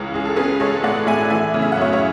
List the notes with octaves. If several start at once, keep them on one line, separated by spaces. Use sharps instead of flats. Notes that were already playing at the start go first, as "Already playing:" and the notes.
Already playing: C#2 C#3 E3
C#2 G#4
A4
C#4 G#4 B4
G#3 A4 C#5
A2 D5 F#5
A2 E5 G#5
E3 E5 G#5
C#3
E5
F#5
F#2 C#5 E5
C#5 E5